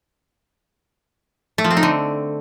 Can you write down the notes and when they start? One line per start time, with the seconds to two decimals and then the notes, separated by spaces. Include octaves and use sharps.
1.58 A3
1.64 F3
1.70 C4
1.77 D#4
1.83 D3